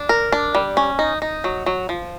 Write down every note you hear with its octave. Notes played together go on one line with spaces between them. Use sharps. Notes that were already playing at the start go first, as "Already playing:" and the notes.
Already playing: D4
A#4
D4
G3
C#4
D#4
D#4
F#3
F#3
F3